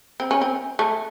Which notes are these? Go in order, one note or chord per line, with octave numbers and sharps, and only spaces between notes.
C4
C#4
C4
A3